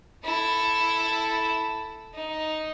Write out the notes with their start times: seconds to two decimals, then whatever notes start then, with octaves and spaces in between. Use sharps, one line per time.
0.24 E4 A4
2.14 D#4